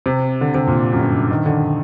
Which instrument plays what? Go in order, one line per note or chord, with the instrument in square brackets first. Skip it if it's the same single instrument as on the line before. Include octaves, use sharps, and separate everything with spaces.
[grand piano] C3
D3
C3
A#2
F#2
G2
D#3
D3